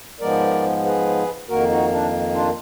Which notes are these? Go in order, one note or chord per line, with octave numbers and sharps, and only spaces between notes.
G#2 F3 G#3 B3 A#4 D5
G#4 B4
F2 D#3 A#3 F#4 A#4
D#4 F#4
D4
D4 F4